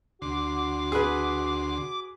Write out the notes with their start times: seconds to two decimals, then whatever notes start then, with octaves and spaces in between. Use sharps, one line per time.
0.22 D2 F#4 C6 D6
0.92 G#4 B4